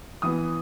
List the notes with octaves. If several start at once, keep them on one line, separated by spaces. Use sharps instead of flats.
E3 B3 D#6